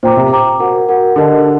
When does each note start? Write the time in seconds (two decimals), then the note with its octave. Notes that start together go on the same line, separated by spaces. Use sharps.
0.03 A#2 C5 G5 A#5 D6
0.17 C3
0.32 C5 G5 A#5 D6
0.60 F#4 A#4 F#5
0.89 F#4 A#4 F#5
1.16 D3 G4 A#4 D#5 A5